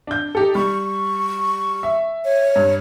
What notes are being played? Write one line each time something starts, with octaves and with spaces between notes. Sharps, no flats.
D4 G6
D#4 G4 A4
G3 C#6
E5
C#5
G2